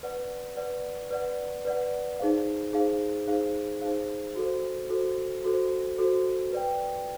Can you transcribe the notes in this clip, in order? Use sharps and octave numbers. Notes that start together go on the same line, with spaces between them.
B4 D5 F#5
B4 D5 F#5
B4 D5 F#5
B4 D5 F#5
D#4 G#4 C5 F5
D#4 G#4 C5 F5
D#4 G#4 C5 F5
D#4 G#4 C5 F5
F#4 A4 C5
F#4 A4 C5
F#4 A4 C5
F#4 A4 C5
B4 D5 G5